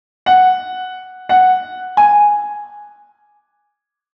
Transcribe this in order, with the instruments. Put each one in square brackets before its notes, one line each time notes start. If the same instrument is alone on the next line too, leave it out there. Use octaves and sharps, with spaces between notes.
[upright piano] F#5
F#5
G#5